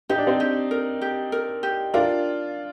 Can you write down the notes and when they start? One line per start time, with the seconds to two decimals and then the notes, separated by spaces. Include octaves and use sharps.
0.09 D#4 G4
0.18 D4
0.27 C4 D#4
0.40 G4
0.71 A#4
1.01 G4
1.32 A#4
1.63 G4
1.94 D4 F4 A#4